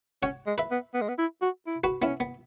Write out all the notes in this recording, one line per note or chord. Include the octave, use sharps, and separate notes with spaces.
C#4 C#5 F#5
G#3
B4 E5
B3
B3
G#3
B3
E4
F#4
E4
F#4 B4
B3 C#4 E4
B3